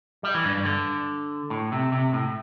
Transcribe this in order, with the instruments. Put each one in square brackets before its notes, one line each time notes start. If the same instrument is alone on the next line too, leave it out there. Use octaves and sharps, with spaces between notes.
[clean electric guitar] G3
E3
G2
G2
D3
A2
C3
C3
A2